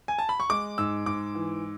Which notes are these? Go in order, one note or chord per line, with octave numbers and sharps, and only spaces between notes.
G#5
A5
B5
C#6
G#3 D6
G#2 E6
G#2 D6
E3